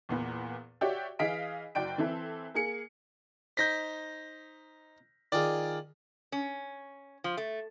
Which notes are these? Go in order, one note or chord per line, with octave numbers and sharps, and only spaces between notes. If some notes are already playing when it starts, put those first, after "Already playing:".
E2 A#2 B3
F#4 G4 C#5 D5 E5 G5
E3 G#4 D#5 F5 B6 D7
F#1 F#4 D5 G5 D7
E3 C4 A4 E5
A#3 G#4 C#7
D#4 C5 G6 A#6 B6
D#3 F4 G#4 D5
C#4
F3
A3